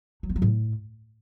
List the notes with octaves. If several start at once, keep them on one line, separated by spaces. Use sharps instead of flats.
F#3
B3
F#3
A2